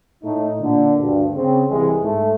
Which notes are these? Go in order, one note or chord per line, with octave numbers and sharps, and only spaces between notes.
A2 A3 D#4
A#2 D3
D2 G2
C#3 C4
C2 E3 G#3
G#2 A3